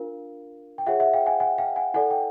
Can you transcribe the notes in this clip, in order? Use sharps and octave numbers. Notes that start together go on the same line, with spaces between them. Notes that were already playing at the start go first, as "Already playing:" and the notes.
Already playing: D4 F4 A#4 F5
G5
F4 G#4 C#5 E5 F#5
E5 F#5
F5 G5
F#5 G#5
F#5 G#5
F5 G5
F#5 G#5
E4 A4 D5 F#5 G#5
G5